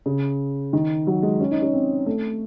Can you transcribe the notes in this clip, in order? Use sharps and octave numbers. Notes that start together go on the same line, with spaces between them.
C#3
D#3
F#3
G#3
C#4
D#4
C#4
C4
A3